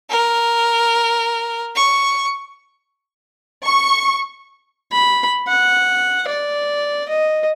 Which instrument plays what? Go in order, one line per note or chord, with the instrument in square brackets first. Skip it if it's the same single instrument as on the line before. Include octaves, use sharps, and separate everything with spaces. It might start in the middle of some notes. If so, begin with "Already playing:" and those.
[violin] A#4
C#6
[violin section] C#6
[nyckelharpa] B5
F#5
D5
D#5